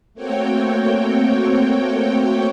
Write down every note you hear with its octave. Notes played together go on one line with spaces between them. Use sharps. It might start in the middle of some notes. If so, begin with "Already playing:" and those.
A3 A#3 C4 F#4 C#5 G5